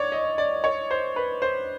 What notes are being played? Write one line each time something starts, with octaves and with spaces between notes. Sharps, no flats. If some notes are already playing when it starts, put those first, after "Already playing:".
Already playing: C#5 D5
D#5
D5
C#5
C5
B4
C5